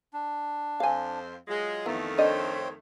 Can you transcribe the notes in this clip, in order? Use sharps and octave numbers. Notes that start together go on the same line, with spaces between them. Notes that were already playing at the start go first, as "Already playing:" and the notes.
D4
F2 C5 F5 G#5
F#3 G#3 F4
F2 D#3 E3 A3 B3 A#4
D4 A4 C5 C#5 D#5 G5